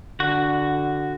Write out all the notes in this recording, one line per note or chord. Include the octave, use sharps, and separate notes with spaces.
D3 F#4